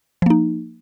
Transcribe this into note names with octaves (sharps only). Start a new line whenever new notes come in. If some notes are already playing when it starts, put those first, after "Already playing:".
F3 A#3 D#4